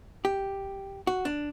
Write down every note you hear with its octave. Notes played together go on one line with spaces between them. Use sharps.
G4
F#4
D4